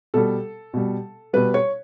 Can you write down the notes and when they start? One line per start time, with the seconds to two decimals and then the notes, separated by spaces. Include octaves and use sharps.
0.14 B2 G3 A4
0.73 B2 G3
1.33 B2 G3 B4
1.54 C#5